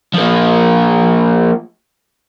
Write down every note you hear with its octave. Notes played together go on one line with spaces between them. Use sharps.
F3 A#3